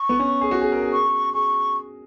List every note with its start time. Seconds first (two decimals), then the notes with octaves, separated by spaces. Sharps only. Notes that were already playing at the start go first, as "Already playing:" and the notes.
Already playing: C#6
0.09 B3
0.19 C#4
0.41 G#4
0.51 F#4
0.61 G#4
0.72 A#4
0.82 G#4
0.93 C#6
1.34 G#4 C#6